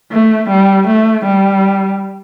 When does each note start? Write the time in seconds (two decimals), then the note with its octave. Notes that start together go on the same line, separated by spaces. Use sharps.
0.12 A3
0.50 G3
0.88 A3
1.25 G3